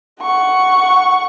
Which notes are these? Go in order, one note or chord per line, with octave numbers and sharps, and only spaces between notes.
F#5 C#6